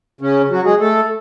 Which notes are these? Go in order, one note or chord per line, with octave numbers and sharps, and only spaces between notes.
C#3 C#4
F#3 F#4
G#3 G#4
A3 A4